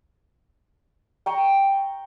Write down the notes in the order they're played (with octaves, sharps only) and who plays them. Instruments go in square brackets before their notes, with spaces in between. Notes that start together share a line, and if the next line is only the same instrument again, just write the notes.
[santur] G5 A#5 C#6